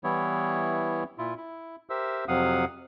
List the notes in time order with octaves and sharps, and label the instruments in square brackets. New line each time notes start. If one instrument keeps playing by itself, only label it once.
[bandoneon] E3 G3 B3 E4 C#5
A#2 E4 F4
E4
G4 A#4 C5 E5 E6
F2 C3 F#3 F5 F#5 D#6